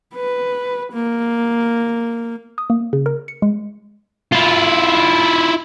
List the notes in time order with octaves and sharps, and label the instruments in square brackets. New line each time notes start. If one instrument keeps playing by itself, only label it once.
[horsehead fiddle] B4
A#3
[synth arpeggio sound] D#6
A#3
C#3
A#4
C#7
G#3
[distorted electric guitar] E4 F4